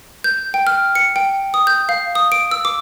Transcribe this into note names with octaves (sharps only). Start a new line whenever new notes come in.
G6
G5
F6
C#7
G5
D#6
G6
F5
D#6
D7
E6
D6